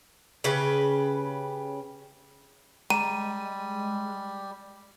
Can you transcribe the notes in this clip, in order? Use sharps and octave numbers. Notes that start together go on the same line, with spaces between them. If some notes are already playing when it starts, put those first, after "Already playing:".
C#3 G4 B4
G3 G#3 A#5 D#7